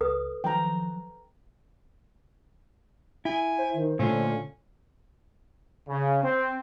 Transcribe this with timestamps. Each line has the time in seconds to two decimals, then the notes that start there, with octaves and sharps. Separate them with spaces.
0.01 C#2 A4 B4 D#6
0.44 D#3 F3 F#3 G5 A#5
3.25 E4 G#5
3.58 C5
3.74 D#3
3.99 A#2 D3 A3 C#4 F4
5.87 C#3
6.24 C4